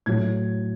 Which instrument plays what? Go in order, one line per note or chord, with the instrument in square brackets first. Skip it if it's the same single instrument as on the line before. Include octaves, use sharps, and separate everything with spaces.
[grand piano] A2 F#3 G#6